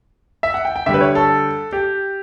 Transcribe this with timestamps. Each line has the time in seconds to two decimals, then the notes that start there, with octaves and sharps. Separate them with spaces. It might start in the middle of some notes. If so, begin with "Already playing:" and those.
0.43 E5
0.54 F#5
0.65 G5
0.76 G5
0.86 D3 G3 E5
0.94 B4
1.01 C#5
1.15 A4
1.73 G4